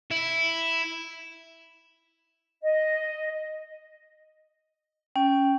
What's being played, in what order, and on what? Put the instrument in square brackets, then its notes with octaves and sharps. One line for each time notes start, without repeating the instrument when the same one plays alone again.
[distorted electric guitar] E4
[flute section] D#5
[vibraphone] C#4 [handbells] G5